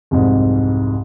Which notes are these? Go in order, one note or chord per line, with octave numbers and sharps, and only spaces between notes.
C2 F2 G#2